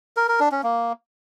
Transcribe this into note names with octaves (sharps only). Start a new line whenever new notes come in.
A#4
A#4
D4
C#4
A#3